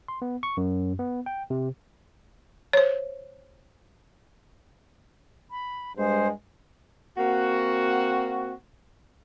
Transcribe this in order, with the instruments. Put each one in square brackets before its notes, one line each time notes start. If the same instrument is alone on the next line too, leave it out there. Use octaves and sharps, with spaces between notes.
[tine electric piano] C6
B3
C#6
F#2
B3
G5
C3
[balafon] C5 C#5
[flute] B5
[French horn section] G2 G#3 [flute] C5
[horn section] A#3 C4 F#4